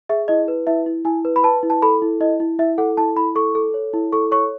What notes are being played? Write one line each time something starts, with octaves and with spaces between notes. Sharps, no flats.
G#4 E5
E4 D#5
B4
E4 E5
E4
E4 G#5
B4
B5
B4 A5
E4
A5
A4 B5
E4
E4 D#5
E4
E4 E5
A4 F#5
E4 A5
E4 B5
A4 C#6
A4
C#5
E4
A4 C#6
C#5 C#6